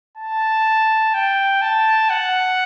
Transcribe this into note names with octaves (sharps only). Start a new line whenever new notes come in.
A5
G5
A5
F#5